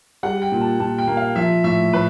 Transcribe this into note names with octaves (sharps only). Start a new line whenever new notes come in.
G3 F#5
G5
A#2
A5
A#2 A5
G5
A#3
F5
F3 E5
A2 E5
A2 B4